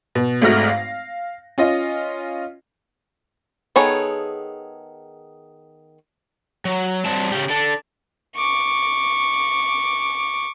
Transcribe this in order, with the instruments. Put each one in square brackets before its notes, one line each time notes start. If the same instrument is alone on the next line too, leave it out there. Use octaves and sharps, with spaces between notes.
[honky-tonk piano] B2
G#1 G#2 A3 F#4 F6 A#6
F5
C#4 F4 D#5
[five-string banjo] D#3 B3 G#4 A4 C#5
[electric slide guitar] F#3
F#3 G3 C4 A5
C#3 C#4 G4
D4 A4
[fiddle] C#6 D6